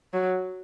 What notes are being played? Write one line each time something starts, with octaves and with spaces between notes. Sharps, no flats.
F#3